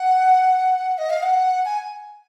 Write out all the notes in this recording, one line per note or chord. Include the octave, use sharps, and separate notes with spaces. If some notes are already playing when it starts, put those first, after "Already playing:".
Already playing: F#5
D#5
F5
F#5
G#5